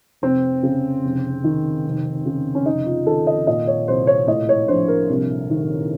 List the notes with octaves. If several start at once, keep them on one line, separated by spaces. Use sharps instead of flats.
F1 C4
C#3
F1
D#3
F1
C#3
C#4
F1 D#4
F4
D#3 A4
D#5
A#2 D#5
C#5
C2 C5
C#5
A2 D#5
C#5
A#1 C5
A#4
C2
D#3